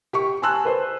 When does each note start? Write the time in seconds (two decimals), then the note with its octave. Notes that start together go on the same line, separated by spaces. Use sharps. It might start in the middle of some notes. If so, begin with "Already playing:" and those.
0.13 G4 G5 C#6
0.42 G#5 A5 C6 E6 F#6
0.65 B4 C5